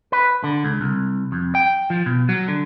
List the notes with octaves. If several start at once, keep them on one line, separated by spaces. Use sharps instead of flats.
B4
D3
C#2
C2
F2
G5
F3
B2
F#3
D3